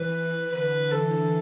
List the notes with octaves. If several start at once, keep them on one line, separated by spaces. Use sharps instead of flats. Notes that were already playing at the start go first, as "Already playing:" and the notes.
Already playing: E3 B4
D3 B4
E3 A4